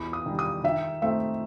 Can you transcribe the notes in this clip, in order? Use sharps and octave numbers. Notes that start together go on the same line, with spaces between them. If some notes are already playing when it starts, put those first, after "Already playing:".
Already playing: E2 B5
D#6
D#3 G3
D#6
D#3 E5
A3 C4 D#4 E5